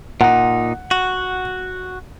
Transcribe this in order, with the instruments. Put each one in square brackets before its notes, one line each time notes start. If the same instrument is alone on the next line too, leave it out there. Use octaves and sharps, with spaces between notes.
[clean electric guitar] A#2 D#4 [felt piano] F#5
[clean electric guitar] F#4